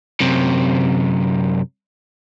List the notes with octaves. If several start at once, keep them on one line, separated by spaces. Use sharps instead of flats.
F#2 C3